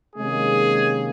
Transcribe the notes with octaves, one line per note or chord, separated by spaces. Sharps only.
C3 D#3 G#3 A#3 C#4 G#4